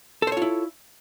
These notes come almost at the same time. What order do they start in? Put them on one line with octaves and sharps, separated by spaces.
A4 C5 C#5 F4 E4